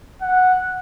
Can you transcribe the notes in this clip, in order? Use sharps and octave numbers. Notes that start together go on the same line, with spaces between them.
F#5